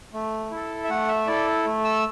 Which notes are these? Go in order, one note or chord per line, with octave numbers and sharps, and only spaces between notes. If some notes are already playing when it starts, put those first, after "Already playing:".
A3
E4
A4
E5
A3 F#5
E5
E4 A4 D5
A3
E6